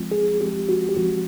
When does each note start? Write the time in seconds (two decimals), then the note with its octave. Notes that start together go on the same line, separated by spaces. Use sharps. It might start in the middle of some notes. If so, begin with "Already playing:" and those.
Already playing: F3 G#3 C4 F4
0.11 G#4
0.40 F3 G#3 C4 F4 G4
0.69 F#4
0.89 G4
0.97 F3 G#3 C4 F4 F#4